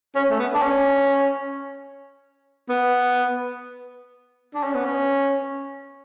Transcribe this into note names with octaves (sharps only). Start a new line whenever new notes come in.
C#4
A3
B3
D4
C#4
B3
D4
C#4
B3
C#4